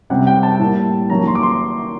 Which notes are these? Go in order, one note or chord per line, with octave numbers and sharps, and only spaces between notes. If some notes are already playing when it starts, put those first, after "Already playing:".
C3 G3 C4 F#5
G5
A5
A2 G3 A#3
D#3 F#3 A#3 A#5
C6
D6
C6